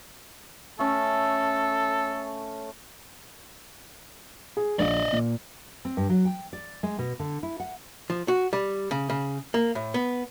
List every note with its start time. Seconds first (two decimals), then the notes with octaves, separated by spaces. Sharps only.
0.79 A3 C#4 A4
4.57 G#4
4.79 A#1 D5 D#5
5.13 A#2
5.85 C4
5.97 G2
6.09 F#3
6.25 G5
6.53 D5
6.83 G#3
6.99 B2
7.20 D3
7.43 E4
7.60 F#5
8.10 F3
8.28 F#4
8.53 G3
8.91 C#3
9.10 C#3
9.54 A#3
9.75 A2
9.94 B3